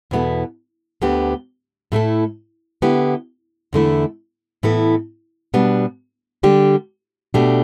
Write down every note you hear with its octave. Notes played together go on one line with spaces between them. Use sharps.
E2 B2 B3 E4 A4
D2 D3 B3 G4
A2 A3 E4 A4
D3 B3 E4 G4
E2 D3 A3 E4
A2 E3 B3 E4 A4
B2 G3 B3 D4
D3 G3 D4 G4
B2 A3 D4 G4